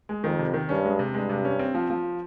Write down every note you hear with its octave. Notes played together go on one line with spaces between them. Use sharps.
G#3
F2 D#3
C3
D#3
G2 C#4
G#3
C3
G2 G#3
C3
C#4
C4
F3
F3